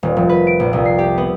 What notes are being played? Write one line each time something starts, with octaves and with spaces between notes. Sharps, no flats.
D#1
F1
B4
D7
A#1
C2
C7
G4
B3